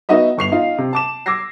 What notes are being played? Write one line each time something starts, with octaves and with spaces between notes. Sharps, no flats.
B3 D#4 F#4 D#5 E5
G1 C#6 C7 F7
D#4 F4
C3
A5 D6 E7
D6 E6 G#6 A#6 C7